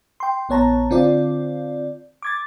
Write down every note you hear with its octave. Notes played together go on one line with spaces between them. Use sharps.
G5 C6
A#1 B3 C#5 A5 A#5
D3 C4 F4 D5
D6 G#6 A6